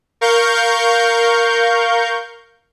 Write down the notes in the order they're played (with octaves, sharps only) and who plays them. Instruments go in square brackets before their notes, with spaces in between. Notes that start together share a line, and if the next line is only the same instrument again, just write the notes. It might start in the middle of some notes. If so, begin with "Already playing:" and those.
[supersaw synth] A#4 F5 C#6 G6